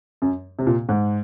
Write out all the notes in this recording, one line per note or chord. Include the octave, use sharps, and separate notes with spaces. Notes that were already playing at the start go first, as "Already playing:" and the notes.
F#2
C3
A#2
G#2